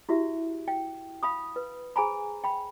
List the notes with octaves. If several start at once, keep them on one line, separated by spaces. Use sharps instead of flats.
E4 F#4 G4 E5
G5
F5 B5 D#6
B4
G#4 C5 G#5 A#5 B5
G5 B5